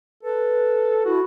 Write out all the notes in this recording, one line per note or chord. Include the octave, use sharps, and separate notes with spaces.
A4 B4
E4 F#4